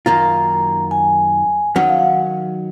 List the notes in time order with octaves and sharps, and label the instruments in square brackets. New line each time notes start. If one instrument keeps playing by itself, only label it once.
[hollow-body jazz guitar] F#2 D#3 A#3 F4 [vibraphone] A#5
[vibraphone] G#5
[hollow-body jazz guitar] D#3 F#3 C#4 [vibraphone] F#5
[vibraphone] F5
F#5